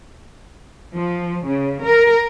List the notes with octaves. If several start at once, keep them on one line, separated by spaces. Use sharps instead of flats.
F3
C#3
A#4